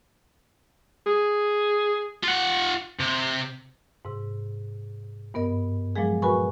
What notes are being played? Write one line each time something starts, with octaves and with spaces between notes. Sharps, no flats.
G#4
F4 F#5
C3
G#2 C3
G2 B3 A#4 D#5
A#2 F3 F#3 G#3 G#4
F#4 A#4 B4 G#5 B5 C#6